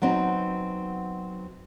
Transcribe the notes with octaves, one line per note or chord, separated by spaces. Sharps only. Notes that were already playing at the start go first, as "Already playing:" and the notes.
F#3 B3 C4 D#4